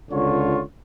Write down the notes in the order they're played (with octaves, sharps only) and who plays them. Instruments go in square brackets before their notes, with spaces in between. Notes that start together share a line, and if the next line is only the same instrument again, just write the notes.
[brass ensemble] C#2 D3 F4 C#5